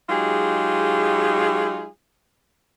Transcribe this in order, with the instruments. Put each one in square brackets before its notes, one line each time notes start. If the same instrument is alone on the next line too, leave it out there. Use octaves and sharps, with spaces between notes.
[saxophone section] F#3 G#3 D#4 F4 G4 G#4